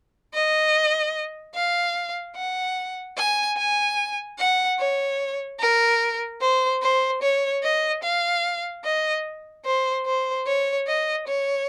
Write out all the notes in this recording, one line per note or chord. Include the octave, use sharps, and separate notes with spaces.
D#5
F5
F#5
G#5
G#5
F#5
C#5
A#4
C5
C5
C#5
D#5
F5
D#5
C5
C5
C#5
D#5
C#5